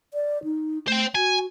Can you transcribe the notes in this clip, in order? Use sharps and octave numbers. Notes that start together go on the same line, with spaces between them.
D5
D#4
A3 C5 G5
F#4 G#5